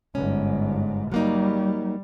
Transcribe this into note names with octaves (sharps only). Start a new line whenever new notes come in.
G1 G#2 C#4
F#3 G3 A#3 D#4